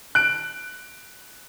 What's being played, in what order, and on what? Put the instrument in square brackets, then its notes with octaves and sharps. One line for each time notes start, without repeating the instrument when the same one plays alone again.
[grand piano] F#6 D7